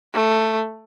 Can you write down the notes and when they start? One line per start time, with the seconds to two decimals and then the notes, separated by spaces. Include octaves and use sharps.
0.14 A3